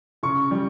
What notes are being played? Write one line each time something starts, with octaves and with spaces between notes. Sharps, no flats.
C#3 C#6
G3